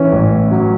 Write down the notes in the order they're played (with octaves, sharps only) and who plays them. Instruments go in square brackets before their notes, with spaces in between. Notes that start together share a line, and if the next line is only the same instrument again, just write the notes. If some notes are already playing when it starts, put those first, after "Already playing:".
Already playing: [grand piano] E3 [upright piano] C#4
[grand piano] A1
F#3